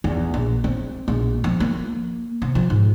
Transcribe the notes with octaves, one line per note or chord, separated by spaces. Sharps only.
E2
A#1
C4
A#1
F3
A#3
C3
F3
G#2